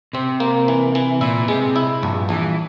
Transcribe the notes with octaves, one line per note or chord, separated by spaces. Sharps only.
C3 C4
A#3
E3
E3
A#2 E4
C3 G#3
E4
A#1 G2
A#1 E3